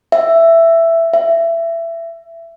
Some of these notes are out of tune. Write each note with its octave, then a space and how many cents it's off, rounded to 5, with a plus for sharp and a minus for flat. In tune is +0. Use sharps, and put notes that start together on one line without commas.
E5 +10
E5 +20